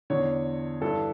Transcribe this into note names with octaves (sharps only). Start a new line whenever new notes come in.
E2 D3 C#5
G2 E3 A4